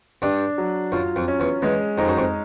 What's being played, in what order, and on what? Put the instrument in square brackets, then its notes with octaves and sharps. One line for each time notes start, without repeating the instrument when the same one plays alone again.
[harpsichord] G2 [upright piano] D4
[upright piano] F#3
[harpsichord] F#2 [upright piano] F4
[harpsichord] F2
[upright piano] C#4
[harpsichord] E2
[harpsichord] E2 [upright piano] G#3
[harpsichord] F2 [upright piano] D#4
[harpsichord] F#2
F2